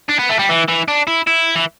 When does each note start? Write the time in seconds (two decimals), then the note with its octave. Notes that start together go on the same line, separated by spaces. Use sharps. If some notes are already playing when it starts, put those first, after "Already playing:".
0.09 D4
0.19 B3
0.30 A3
0.39 G3
0.49 E3
0.69 E3
0.88 D4
1.07 E4
1.27 E4
1.56 E3